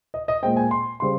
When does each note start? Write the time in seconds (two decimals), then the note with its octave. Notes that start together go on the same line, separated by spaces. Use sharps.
0.14 D#5
0.28 D#5
0.42 A#2 G#3 C4 G5
0.57 G#5
0.71 C6
1.00 C#3 G3 C4 C6